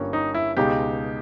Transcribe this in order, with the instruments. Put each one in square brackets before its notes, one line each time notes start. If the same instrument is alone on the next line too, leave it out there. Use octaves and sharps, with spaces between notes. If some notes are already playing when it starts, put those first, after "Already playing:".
Already playing: [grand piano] G1 G2 G3 A#3 C#4
[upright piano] D#4
E4
[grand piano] C#2 B2 G#3 D#4 [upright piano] G4